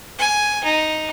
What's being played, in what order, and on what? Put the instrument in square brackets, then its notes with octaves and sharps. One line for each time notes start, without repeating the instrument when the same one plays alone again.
[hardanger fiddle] G#5
D#4